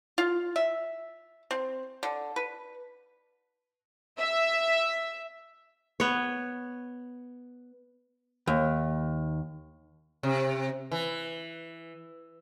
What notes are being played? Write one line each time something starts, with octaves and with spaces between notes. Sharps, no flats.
F4
E5
C4
D3
B4
E5
B3 C#5
D#2
C3
E3